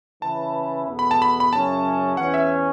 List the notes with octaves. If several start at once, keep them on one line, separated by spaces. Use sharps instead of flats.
C#3 E3 C#4 E4 B4 A5
E2 B2 B3 A4
B5
A5
B5
B5
F#2 C#3 F#3 C#4 E4 A5
E2 E3 C#4 F#5
E5